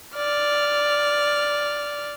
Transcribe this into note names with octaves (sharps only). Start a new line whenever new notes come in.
D5 F6